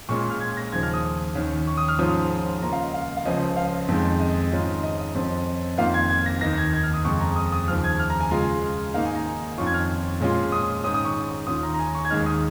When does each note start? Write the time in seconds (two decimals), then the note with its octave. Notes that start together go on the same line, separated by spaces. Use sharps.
0.09 A#2 G#3 C#4 F4 C#6
0.30 F6
0.40 G#6
0.57 A#6
0.72 D#2 C#3 F3 G#6
0.83 F6
0.94 D#6
1.35 D#2 D#3 C#4
1.67 C#6
1.78 D#6
1.88 F6
1.99 G#2 F3 C#4 F4 D#6
2.62 C#2 C#3 A#3 F4 A#5
2.72 F5
2.83 D#5
2.94 F5
3.17 F5
3.25 C#2 C#3 F3 C#4 D#5
3.57 F5
3.88 F2 D#3 G#3
4.20 D#5
4.52 G#2 D#3 C#4 F4
4.83 D#5
4.99 D#5
5.15 F2 F3 C#4
5.78 F2 D#3 A#3 F4 F5
5.94 G#6
6.10 G#6
6.26 A#6
6.41 D#2 D#3 A#3 D#4 A#6
6.57 G#6
6.73 G#6
6.83 F6
6.94 D#6
7.05 F2 C#3 G#3 C#6
7.20 A#5
7.36 D#6
7.52 D#6
7.68 D#2 C#3 F3 F6
7.84 G#6
7.99 F6
8.10 A#5
8.21 G#5
8.31 C#3 G#3 F4
8.94 G#2 D#3 A#3 D#4 F5
9.05 G#5
9.15 A#5
9.57 F2 D#3 C#4 F4 C#6
9.67 G#6
9.74 F6
10.21 A#2 G#3 C#4 F4
10.52 D#6
10.84 G#2 D#3 C#4 D#6
10.94 D#6
11.05 C#6
11.47 D#2 D#3 C#4 F4 D#6
11.63 A#5
11.74 A#5
11.79 G#5
11.95 C#6
12.05 G#6
12.10 D#2 D#3 G#3 D#4 F6
12.26 D#6